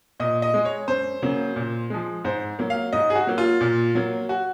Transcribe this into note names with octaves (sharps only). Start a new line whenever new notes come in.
A#2 D#5
D#5
G#3
C#5
F#2 C5
C#3 F#3 A#3
A#2
F3 G#3
G#2 C5
F#3 A#3
F5
G#2 D#5
G#4
F#4
F#3 A#3
F4
A#2
F#3 A#3
F#4